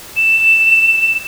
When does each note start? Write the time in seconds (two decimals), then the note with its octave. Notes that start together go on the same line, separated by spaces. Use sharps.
0.16 E7